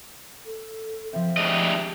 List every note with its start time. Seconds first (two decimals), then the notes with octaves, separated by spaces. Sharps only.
0.46 A4
1.13 F3 C4 E5
1.37 D2 G#3 G4 D#5 F6